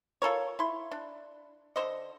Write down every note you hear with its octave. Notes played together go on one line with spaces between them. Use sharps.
F4 A4 A#4 C#5
E4 C6
D4
D3 C5 D#5